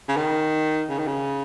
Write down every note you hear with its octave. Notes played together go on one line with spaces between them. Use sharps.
C#3
D#3
C#3
D#3
C#3